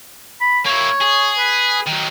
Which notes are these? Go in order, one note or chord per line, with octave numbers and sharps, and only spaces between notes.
B5
A#3 E4 C#5
G#4
B4
D#3 F#3